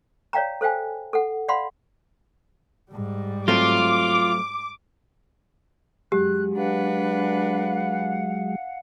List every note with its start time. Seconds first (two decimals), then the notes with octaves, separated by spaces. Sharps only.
0.33 C#5 D5 F5 G5 A#5
0.61 A4 C5 F5 G5 G#5
1.13 A4 F#5
1.48 D5 F5 F#5 B5 C6
2.91 G#2 G3
3.48 F#3 A3 C4 F4 D6
6.12 F#2 F#3 G#3 G4 F#6
6.55 D4 B4 F5 F#5